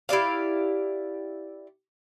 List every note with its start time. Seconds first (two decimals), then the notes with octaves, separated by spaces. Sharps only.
0.09 E4 G4 D5 F5